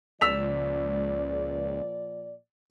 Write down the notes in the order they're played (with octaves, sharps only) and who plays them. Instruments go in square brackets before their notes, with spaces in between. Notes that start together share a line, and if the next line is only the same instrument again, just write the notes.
[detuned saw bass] C#2 [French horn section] A#2 F3 D5 [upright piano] E6 B6 F7